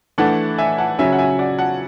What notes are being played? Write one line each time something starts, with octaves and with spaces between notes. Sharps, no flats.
E3 A3 D4 F#5 A5
E5 G#5
F#5 A5
C#3 F#3 C#4 E5 G#5
F#5
E5 G#5
D5 F#5
F#5 A5